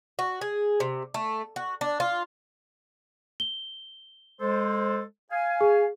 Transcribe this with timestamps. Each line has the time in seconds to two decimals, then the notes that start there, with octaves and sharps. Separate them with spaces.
0.19 F#4
0.41 G#4
0.80 C3
1.14 A3
1.56 F#4
1.81 D4
2.00 F4
3.40 G7
4.41 G#3 A4 C5
5.31 F5 G#5
5.61 G#4